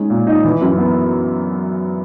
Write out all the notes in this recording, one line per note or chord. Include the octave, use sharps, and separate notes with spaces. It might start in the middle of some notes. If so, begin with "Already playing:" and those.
Already playing: G#3 C#4 D#4
A#2
D#4
E3
F#2
B3